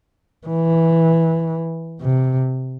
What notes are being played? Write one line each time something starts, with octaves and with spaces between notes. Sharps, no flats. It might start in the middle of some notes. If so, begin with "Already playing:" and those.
E3
C3